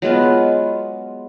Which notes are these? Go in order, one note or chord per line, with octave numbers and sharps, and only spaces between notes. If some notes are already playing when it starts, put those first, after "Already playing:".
F#3 G#3 B3 F4